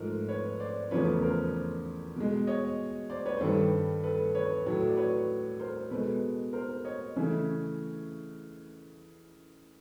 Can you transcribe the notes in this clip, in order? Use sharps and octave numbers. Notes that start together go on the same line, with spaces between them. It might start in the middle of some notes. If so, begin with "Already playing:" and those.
Already playing: G#2 F3 A3 A#4 C5
B4 C#5
C5 D5
E2 C#3 F3 A3 B4 C#5
A#4 C5
B2 G#3
C#5 D#5
C5 D5
B4 C#5
C5
G2 D#3 G3 A4 B4
A4 B4
B4 C#5
A2 F#3 A3
D5
B4 C#5
A#4 C5
B2 G#3 A4 B4
A#4 C5
C#5 D#5
C#3 E3 A3